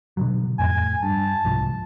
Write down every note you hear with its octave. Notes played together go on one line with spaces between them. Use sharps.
B2 D3 F#3
F2 A2 G#5
G2 A5
C2 G#2 F3